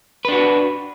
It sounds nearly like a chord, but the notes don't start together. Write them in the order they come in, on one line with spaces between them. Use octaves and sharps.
B4 D4 F#4